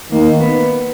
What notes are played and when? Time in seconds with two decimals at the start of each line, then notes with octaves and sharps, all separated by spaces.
0.12 D#3 A#3
0.40 B3